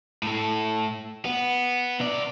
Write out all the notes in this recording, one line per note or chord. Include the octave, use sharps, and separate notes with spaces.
A2 A4
B3
C3 D5